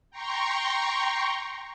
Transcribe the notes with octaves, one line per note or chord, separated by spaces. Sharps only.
G5 A#5 C6 C#6